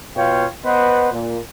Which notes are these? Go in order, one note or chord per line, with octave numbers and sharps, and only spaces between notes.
B2 F4 C#5 F5 G5
B3 B4 C5 D#5 F#5
A#2